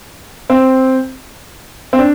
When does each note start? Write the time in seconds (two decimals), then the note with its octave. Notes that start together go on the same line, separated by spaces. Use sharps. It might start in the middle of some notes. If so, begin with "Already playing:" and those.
0.50 C4
1.93 C4
1.99 D4